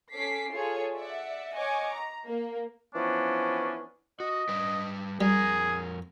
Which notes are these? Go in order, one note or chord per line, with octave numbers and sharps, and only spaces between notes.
C#4 A4 D6 B6 C7
F4 G#4 A4 C#5
D5 E5 F#5
C#5 D#5 F#5 G#5 C#6 D6
A#5
A#3 A#4
E3 F3 B3 C#4 D4
F#4 D#5
G3 B4 D5
F2 G3 G#4 A#4